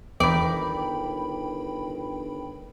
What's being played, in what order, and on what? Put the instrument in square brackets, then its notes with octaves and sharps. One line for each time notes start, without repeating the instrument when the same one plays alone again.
[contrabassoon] G1 [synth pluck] E2 [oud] D#3 D5 [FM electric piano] G5 B5